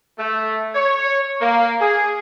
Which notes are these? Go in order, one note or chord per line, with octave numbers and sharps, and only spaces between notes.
A3
C#5
A#3
G#4